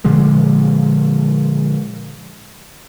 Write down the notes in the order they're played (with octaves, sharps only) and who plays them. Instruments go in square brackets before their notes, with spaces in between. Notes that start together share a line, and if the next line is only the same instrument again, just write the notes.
[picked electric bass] A#2 D3 F3 G#3